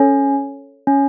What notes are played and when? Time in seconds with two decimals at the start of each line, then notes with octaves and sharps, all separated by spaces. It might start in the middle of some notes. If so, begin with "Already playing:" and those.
Already playing: C#4 A4 C#5
0.87 C#4